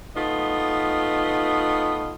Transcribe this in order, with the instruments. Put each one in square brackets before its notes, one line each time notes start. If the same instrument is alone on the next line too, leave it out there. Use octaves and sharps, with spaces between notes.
[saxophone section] A3 B3 D#4 F4